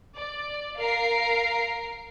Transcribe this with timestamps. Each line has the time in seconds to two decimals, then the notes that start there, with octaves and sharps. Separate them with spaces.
0.17 D5
0.79 A#4 F5 A#5 C7 D7